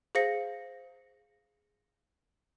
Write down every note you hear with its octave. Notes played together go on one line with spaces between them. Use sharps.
G#4 C5 F5 A#6 C#7